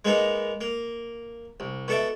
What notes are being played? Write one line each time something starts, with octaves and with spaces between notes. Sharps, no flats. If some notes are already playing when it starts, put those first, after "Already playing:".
G#3 A#3 B3 D#4
A#3
C2
B2 A4 D5 E5